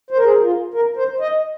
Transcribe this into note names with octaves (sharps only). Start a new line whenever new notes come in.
C5
A#4
G#4
A#4
F4
A#4
C5
D#5